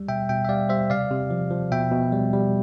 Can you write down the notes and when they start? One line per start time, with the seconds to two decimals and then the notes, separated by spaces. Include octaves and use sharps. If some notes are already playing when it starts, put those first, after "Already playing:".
Already playing: G3
0.08 B2 E5 G5
0.29 B2 E5 G5
0.45 E5
0.49 G3 D5 F5
0.69 G3 C5 E5
0.90 C3 D5 F5
1.10 C3
1.30 F3
1.51 F3
1.71 B2 E5 G5
1.91 B2
2.12 G3
2.33 G3